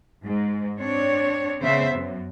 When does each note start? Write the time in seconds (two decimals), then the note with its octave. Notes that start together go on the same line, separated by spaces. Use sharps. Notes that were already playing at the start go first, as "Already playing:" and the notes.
0.24 G#2
0.78 C4 D4 C#5
1.61 C#3 B3 C5 E5
1.95 F#2